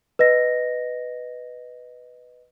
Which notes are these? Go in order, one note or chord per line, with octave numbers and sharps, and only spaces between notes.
B4 D#5 A#6